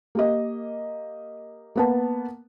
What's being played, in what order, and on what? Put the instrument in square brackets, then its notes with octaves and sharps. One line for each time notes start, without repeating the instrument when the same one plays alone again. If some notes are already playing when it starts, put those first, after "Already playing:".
[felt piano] A#3 G4 D#5
A#3 B3 A5